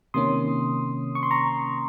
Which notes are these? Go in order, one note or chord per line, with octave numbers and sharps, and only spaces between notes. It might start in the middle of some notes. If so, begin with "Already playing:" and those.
C3 D#3 A#3 C#4 C6 D#6
C#6
C6
A#5 C#6